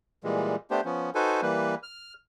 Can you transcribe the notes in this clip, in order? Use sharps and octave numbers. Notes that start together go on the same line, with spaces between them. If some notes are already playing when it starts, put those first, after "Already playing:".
A#2 E3 G3 G#3
A3 B3 D4 G4 C5
F3 B3 C#4
D#4 F#4 A4 B4 C5 G#5
E3 G3 A#3 B4
F6